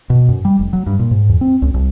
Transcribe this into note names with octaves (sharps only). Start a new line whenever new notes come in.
B2
F#2
G3
F1
F#3
G2
A#2
G#2
E2
C4
C#2
C2